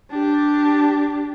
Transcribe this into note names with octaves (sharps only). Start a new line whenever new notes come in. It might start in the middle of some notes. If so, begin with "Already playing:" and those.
D4 G4